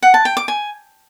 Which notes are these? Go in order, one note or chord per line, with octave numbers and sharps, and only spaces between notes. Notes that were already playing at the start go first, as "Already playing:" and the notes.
F#5
A5
G5
D6
G#5